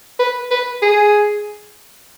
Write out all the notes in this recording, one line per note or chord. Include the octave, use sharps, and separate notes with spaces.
B4
B4
G#4